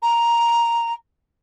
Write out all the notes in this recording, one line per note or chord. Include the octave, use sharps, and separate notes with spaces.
A#5